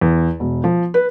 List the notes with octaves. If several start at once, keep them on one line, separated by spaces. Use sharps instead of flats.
E2
E1
F3
B4